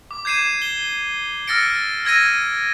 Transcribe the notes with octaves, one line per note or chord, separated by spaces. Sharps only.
D6
G6 G#6 C7 D#7 E7
G7
E6 F6 A6 A#6 C#7 D7
E6 G#6 A#6 D#7